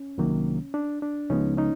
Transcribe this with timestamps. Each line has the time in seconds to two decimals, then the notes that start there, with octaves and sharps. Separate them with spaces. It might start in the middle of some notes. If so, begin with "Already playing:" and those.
Already playing: C#4
0.18 C2 C3 D#3 F#3 A#3
0.74 D4
1.02 D4
1.29 C#2 C#3 F3 G#3 B3 C#4 D#4
1.57 C#4 D#4